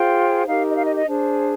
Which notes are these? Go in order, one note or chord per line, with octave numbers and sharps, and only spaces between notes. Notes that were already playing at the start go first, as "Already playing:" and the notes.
Already playing: F4 G#4 C5 G5
D#4 G4 A#4 F5
D#5
F5
D#5
D#5
D4 G#4 C5